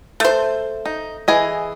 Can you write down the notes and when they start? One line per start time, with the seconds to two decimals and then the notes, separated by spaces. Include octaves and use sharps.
0.20 A3 C5
0.86 D#4
1.28 E3 G#4 D#5